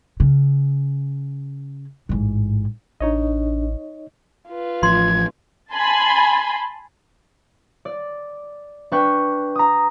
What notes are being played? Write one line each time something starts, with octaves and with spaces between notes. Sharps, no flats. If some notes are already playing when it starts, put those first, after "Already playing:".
C#3
A1 G#2
A1 D4 D#4 C#5 D#5
F4 B4
A1 F3 C6 G#6
G#5 A5 B5 C6
D5
D4 B4 G5 C#6
A#5 D#6